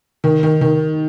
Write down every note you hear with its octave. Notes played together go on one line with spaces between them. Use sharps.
D#3
D#3
D#3